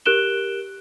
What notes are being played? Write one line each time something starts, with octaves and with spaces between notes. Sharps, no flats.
G4 A#4 F#6 D7 E7 G7